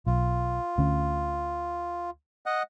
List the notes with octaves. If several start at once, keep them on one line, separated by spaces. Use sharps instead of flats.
B1 F4
D2 D3 C#4
D#5 F#5